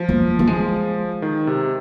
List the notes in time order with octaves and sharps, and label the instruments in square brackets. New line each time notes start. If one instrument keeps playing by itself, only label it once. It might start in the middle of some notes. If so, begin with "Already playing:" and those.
Already playing: [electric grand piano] F3
[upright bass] A#3
A#3
G#3
[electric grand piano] D#3
C3